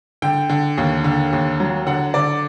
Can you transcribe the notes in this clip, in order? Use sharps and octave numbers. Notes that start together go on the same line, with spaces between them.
D3 G5
D3
D#2
D3
D#2
F#3
D3 F#5
D3 D5